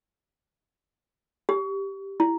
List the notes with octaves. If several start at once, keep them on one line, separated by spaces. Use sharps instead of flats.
G4
E4